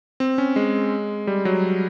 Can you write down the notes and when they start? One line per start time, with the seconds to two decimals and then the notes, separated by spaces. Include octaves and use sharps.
0.20 C4
0.38 C#4
0.56 G#3
1.27 G3
1.45 F#3